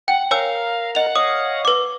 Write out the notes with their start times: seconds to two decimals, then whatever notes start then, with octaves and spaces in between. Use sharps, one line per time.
0.08 F#5 G5
0.31 A#4 C#5 F5 G#5 E6
0.95 D#5 F#5 F7
1.16 C#5 D#5 F5 D#6
1.65 B4 D6